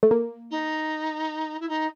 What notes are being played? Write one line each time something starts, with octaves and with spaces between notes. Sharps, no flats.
A3
A#3
D#4
E4
D#4